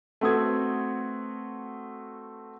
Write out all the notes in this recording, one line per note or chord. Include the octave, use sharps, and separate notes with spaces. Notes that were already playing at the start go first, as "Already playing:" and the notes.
A3 C4 F#4 B4 D#6 G#6